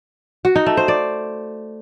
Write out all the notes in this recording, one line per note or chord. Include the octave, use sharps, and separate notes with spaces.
F#4
D#4
A3
C5
D5